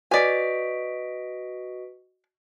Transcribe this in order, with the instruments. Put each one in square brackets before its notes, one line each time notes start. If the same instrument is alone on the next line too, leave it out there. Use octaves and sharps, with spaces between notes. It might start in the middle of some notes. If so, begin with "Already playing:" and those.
[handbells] F#4 D#5 [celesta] B4 B6 D7 [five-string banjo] D5 G#5